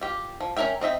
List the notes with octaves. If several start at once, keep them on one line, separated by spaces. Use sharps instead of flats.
F4 G4
F3
C#4 E4 A#4 E5 G5
C4 D#4 E5 G5